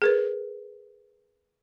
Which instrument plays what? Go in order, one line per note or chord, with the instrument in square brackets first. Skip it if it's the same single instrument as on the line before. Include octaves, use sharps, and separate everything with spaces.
[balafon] G#4 A#4 B4